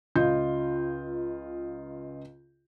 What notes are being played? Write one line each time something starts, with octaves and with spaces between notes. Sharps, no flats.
C#2 F4 D#5 G6